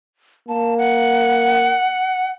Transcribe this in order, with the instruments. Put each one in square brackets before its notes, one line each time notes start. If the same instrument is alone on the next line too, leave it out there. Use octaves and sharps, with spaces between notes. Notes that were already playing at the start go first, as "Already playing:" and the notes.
[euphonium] A#3 [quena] A5
[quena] F#5